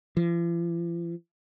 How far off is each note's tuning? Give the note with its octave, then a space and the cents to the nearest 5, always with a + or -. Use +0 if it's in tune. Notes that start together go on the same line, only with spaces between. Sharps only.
F3 -45